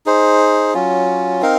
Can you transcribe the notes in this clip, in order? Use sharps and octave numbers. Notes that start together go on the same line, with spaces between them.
D#4 G#4 C5
F#3 C#4 F4
C4 D#4 A#4 F5